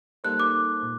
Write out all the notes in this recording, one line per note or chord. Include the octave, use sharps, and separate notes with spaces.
G3 A#3 D#4 A4 C5 F#6
D6
A#2